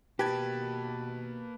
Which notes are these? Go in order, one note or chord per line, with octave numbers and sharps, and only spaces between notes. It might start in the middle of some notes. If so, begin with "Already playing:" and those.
B2 A#3 G4 B4 D#5 A5 G#6